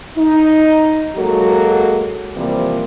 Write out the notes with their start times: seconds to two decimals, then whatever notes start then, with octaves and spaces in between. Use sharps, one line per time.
0.17 D#4
1.16 F#3 G#3 A#3 F#4 A4
2.35 C3 E3 F3 G3 A#3